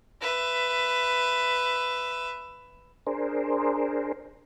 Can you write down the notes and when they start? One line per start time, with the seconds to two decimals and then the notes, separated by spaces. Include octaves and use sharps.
0.21 B4 E5
3.07 D4 G#4 A#4 C5